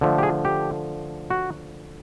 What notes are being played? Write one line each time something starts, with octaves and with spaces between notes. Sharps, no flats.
D3 F3 A3
G4
G#4
G4
F#4